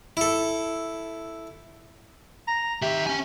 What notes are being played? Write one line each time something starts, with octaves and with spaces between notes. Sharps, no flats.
E4 A4
A#5
D#3 G4 E5
C#4 G#5